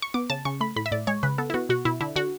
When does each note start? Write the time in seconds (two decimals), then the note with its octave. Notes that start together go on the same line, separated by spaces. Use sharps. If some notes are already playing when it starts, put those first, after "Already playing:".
0.02 C#6
0.14 B3 D6
0.30 C#3 A5
0.45 C#3 C#6
0.61 A3 B5
0.76 A2 B5
0.86 E5
0.92 A2 D5
1.07 G#3 C#5
1.23 C#3 B4
1.38 B3 A4
1.50 E4
1.54 B3 F#4
1.69 B2 F#4
1.85 B2 E4
2.01 D3 E4
2.16 D3 F#4